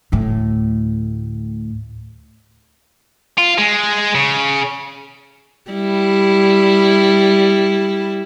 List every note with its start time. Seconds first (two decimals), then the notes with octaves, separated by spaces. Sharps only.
0.12 D2 A2
3.38 F4
3.58 G#3
4.15 C#3
5.71 G3 E4